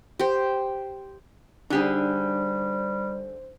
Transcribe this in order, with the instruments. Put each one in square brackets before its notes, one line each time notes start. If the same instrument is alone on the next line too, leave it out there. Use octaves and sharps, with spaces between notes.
[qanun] G4 C5
[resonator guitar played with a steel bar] D3 G4 G#4 [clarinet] G3 [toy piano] D4 D#4 [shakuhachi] C5